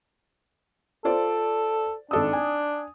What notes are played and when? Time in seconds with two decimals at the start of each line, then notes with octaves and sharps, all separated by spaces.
1.05 F4 A4 C5 D5
2.11 G#1 D4 A4 D#6
2.33 G#5